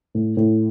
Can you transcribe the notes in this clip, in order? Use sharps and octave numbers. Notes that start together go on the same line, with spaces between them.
A2
A2